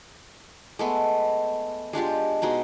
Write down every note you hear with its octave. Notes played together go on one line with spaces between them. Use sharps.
G#3 A3 B3
G#3 D4 F4 G4
B2 G#3 D#4 F#4